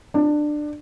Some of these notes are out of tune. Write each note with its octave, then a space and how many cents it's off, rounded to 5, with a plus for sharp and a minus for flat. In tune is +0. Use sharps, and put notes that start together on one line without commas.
D4 +20